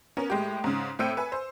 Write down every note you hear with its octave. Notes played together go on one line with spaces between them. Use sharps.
B3 C#4 A#4
A2 G#3 G4
G#2 C#3
A2 C4 G5 E6 C#7 D#7
B4 G#5
C5